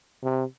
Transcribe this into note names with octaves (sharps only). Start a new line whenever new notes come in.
C3